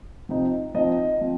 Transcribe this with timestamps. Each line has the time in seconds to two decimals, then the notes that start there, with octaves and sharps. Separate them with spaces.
0.29 C3 F3 C4 D#4
0.74 F3 C4 D#4 D#5
1.21 F3 C4